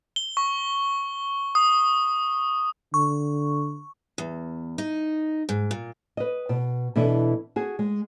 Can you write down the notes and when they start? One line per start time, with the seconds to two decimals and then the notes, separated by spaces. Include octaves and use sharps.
0.16 G7
0.37 C#6
1.55 D#6
2.94 D3 C#6
4.18 E2
4.78 D#4
5.49 G#2
5.71 A#2
6.17 B4 D#5
6.49 B2
6.96 B2 E3 D4 E4 A4
7.56 F#4 G#4
7.79 G#3